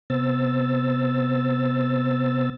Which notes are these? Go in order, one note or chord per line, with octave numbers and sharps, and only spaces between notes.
C3 B3 C5 E6 A6